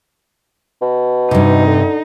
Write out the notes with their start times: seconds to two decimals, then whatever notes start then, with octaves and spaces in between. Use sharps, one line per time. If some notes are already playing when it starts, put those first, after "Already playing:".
0.82 B2
1.31 G2 C3 D#4
1.67 D3